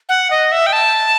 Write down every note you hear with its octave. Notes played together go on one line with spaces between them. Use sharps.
F#5
D#5
E5
G5
A5